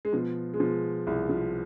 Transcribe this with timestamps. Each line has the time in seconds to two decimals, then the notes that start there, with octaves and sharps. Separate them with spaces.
0.05 G#3
0.13 B2 F3
0.54 G#3
0.60 B2 F3
1.07 C2 G#3
1.29 F3